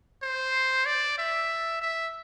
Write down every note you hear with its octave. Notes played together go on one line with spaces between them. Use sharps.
C5
D5
E5
E5